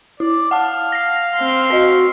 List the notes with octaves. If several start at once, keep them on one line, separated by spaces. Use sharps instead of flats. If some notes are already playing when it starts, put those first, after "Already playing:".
E4 D5
F5 F#5 A5
A#6 C7
C4 C6
F#4 C5 D#5